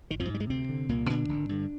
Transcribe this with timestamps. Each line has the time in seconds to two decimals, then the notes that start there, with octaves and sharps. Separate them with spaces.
0.10 G#1 D#3
0.20 F2 F3
0.29 G#2
0.34 G3
0.40 G#2 G#3
0.50 D2 C3 C4
0.69 D3
0.89 C2 A#2 A#3
1.09 A#2 D3 D4
1.29 G#1
1.49 G2 D3